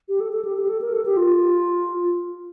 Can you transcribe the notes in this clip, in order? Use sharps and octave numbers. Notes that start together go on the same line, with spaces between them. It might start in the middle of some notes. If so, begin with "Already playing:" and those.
G4
A4
A4
G4
G4
A4
A#4
A4
G4
F4